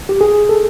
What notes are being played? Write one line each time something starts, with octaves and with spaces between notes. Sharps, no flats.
G4
G#4
A4